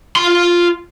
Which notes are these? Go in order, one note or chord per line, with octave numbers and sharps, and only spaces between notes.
F4 C6